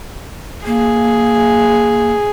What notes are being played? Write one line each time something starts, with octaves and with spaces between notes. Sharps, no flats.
A#3 G#4